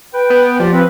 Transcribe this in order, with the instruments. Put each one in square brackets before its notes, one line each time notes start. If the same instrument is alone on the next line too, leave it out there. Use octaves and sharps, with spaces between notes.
[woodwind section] B4 G5
[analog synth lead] B3
[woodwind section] D#2 G4 D5 [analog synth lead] F3
[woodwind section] C4 B4